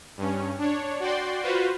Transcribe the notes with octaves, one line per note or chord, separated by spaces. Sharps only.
G2 C#4
D4 C#5
F#4 D5 G5 C6
F4 F#4 B4 C5